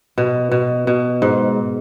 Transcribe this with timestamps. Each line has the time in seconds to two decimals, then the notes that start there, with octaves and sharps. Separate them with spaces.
0.18 B2
0.51 B2
0.87 B2
1.22 G#2